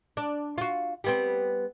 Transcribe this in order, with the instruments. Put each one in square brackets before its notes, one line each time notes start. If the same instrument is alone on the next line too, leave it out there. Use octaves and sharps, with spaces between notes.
[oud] D4
F4 F#4
G3 B3 C4